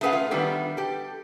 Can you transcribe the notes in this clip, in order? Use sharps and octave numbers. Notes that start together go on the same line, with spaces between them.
A3 C#4 G#4 B4 F5 F#5
A3 F4
D#3 E3 G3 B3 D4
G4 A4